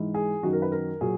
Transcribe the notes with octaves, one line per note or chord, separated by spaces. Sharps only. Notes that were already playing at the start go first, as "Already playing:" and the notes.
Already playing: G#2 E3
G#4
F#2 D#3 F#3 F#4
A#4
B4
A#4
A#2 F#3 G#4